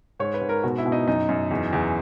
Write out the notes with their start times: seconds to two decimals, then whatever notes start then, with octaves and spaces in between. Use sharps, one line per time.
0.20 G#2 C#5
0.34 B4
0.41 G#2
0.49 A#4
0.63 B2 F#4
0.78 E4
0.86 B2
0.92 D#4
1.07 F#2 D#4
1.29 F#2
1.51 E2
1.73 E2